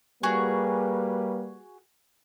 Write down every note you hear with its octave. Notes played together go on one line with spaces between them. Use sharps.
G3 A#3 F#4 G#4 B4